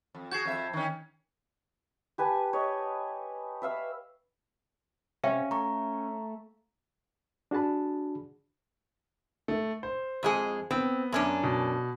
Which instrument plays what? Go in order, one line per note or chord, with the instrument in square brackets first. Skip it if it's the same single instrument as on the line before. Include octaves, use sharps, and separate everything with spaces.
[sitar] F2
[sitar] F#4 G#4 [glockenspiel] G6 G#6 C7
[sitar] F2 E5
D#3 C#4
[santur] G4 B4 G#5 A5
C#5 D#5
B4 E5 F5 E6
[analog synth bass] C3 [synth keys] C#4 [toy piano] E5 F5 G5
[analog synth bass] A3 [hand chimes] A#5 C#6
[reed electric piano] D4 F#4 G#4 A5 B5
[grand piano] A3
C5
[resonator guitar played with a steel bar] F2 G#3 G#4
[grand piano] B3 [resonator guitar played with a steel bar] C4
[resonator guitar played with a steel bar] F#2 C#4 D4
[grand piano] B2